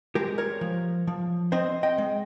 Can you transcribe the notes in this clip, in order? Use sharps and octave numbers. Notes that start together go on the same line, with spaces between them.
G#3 G4 A#4
A#4 C#5
F3
F3
C4 C5 D#5
D#5 G5
G#3